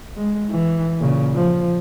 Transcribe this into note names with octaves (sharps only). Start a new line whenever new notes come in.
G#3
E3
A#2 C#3
F3